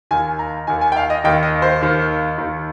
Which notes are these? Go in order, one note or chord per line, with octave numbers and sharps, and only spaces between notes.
D#2 D#3 G#5
A#5
D#2 D#3 G#5
G#5
G5
F5
D#5
D#2 D#3 G5
D#5
C5
D#2 D#3
D#2 D#3